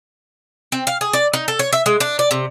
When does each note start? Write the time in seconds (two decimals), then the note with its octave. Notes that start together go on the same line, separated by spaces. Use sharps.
0.72 C4
0.87 F5
1.01 G#4
1.13 D5
1.33 D#4
1.48 A4
1.59 C#5
1.73 E5
1.86 G#3
2.00 D4
2.19 D5
2.31 C3